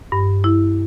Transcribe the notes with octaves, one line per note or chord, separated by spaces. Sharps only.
G2
E4